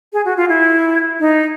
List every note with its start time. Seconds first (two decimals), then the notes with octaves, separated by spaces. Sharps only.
0.13 G#4
0.25 F#4
0.37 F4
0.49 E4
1.20 D#4